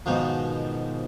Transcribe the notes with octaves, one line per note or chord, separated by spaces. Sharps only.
G#2 B2 D#3 F3